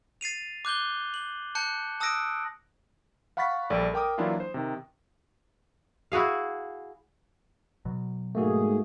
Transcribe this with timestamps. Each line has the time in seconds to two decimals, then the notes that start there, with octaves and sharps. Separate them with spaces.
0.21 A6 C7 D#7 F7
0.65 D6 F#6 G6 G7
1.14 F#7
1.55 A5 F#6 G6 C#7
2.00 A5 D#6 E6 F#6 A#6 D7
3.37 F5 F#5 B5 C#6 A6 B6
3.70 A#1 G3 A4 D5
3.94 A#4 G5 D6 D#6
4.18 E3 F#3 A#3 D4 E4 F4
4.40 C5
4.54 C3 D#3
6.12 E4 F#4 G#4 F5
7.85 B2 F#3
8.35 G#2 A3 A#3 F#4 G#4